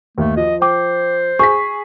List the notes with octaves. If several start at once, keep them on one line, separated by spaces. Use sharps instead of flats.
D#2 A3
F3 D#5
C5 G5 D6
G#4 C#6 B6